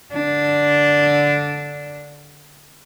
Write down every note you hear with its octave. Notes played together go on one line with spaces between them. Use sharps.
D3 D4